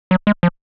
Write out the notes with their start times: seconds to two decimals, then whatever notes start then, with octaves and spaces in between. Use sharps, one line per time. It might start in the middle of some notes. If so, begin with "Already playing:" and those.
0.11 F#3
0.27 G#3
0.43 F3